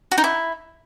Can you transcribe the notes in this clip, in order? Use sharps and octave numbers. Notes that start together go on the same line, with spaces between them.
F#4
D#4
E4